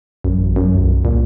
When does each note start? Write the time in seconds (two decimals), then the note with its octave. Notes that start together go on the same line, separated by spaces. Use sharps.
0.24 A1 F#2
0.56 F#2
0.75 B1
1.05 C2 A#2